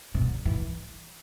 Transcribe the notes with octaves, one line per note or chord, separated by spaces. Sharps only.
C3
D3
E3